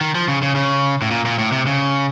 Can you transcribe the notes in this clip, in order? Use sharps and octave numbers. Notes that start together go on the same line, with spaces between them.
D#3
F3
C#3
C#3
C#3
A2
A#2
A#2
A2
C3
C#3